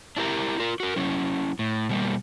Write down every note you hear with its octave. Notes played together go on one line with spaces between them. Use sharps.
D4 E4 G4 A#4 A#5
F4 A#4
F#4 A#4
F#3 C#4 E4
A2
B2 G3 A#3